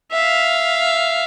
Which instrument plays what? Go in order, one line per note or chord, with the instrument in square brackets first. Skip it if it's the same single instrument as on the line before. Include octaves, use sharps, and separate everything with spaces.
[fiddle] E5 F5